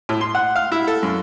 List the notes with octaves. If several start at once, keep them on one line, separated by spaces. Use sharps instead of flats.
A2
C6
F#5
F5
E4
A4
F#2